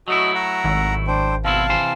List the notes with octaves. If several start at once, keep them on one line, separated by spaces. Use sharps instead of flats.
F#3 A3 E4 F#4 D#5
F#5 A#5
G#1
D4 C5 G5
B2 C4 E4 F5 A5
C3 E3 C5